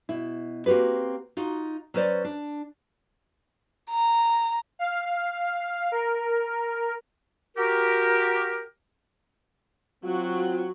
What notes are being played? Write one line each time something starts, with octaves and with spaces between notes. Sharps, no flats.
B2 E4
A#3 C4 F#4 G4 B4
D#4 F4 F#4
F#3 C#4 B4 C5 D5
D4
A#5
F5
A#4
F#4 G4 A#4
F#3 C4 F4 F#4